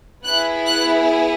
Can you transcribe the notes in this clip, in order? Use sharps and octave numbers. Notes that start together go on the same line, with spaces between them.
B3 E4 G#4 F#6
F#6